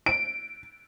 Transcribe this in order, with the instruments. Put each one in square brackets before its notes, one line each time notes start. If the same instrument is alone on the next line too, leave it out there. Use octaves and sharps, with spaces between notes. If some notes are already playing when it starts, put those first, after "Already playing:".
[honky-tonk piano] D7